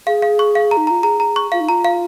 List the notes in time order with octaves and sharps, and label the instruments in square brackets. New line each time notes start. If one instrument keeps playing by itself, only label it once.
[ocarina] G#4 [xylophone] F5
[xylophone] F5
C#6
F5
A#5
[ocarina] D#4
[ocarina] F4 [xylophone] A#5
[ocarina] G#4 [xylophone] A#5
[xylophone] A#5
C#6
[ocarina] F4 [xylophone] F5
[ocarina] D#4
[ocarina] F4 [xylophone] A#5
[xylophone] F5